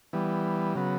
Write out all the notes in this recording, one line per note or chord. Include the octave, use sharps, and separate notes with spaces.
E3 G3 B3
C#3 F#3 B3